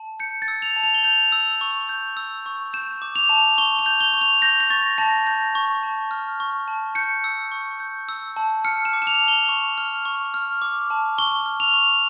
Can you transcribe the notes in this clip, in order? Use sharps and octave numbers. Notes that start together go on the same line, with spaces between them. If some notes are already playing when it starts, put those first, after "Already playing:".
Already playing: A5
G6 C#7
A6
E6
F7
A5
F7
G7
G6 F7
E6
C#6
G6
E6
C#6
G6 E7
D6
F7
A5
C#6 G7
F7
G6
G7
C#6
F7
G6 A#6
A#6
C#6 A6
A5 A#6
G6
C#6
A5
F6
C#6
A5
G6 C#7
E6
C#6
G6
E6
A5
F6 C#7
E7
D6
E7
F7
A5
G7
C#6
F6
C#6
F6
D6
A5
C#6 G7
F6
F7
C#6